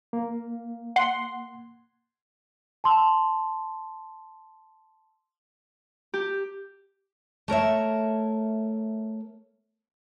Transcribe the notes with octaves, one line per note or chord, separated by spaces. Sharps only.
A#3
F#5 C6
A5 C6 E6
G4
A3 A#4 C#5 E5